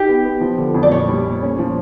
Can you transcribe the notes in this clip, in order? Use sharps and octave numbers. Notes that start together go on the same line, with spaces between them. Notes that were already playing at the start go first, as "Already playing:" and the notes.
Already playing: D#4 G4
B3
B3
F3
D3
F2
D5
A#2 C#5
G3
A#2
C#4
F3